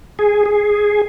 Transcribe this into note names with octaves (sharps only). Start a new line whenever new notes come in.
G#4
G#4